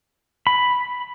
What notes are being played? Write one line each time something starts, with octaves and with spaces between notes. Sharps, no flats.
B5